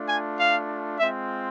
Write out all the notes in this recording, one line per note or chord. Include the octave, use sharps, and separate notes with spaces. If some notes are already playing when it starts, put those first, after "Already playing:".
Already playing: A3 D4 F4
G#5
F5
G#3 C4 F4 E5